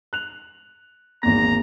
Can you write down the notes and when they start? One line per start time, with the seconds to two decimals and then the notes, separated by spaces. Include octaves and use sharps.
0.13 F#6 F7
1.23 G#1 E2 A#3 A#5 A#6